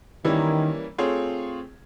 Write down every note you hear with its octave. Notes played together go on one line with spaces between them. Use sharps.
D#3 E3 G3 A#3 C#4 E4
A3 C4 F4 G#4 C#5